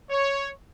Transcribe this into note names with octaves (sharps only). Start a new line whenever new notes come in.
C#5